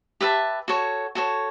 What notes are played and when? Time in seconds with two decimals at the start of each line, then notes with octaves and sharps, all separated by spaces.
0.21 G4 B4 E5 A5
0.68 F#4 A4 C#5
1.15 F#4 A4 C#5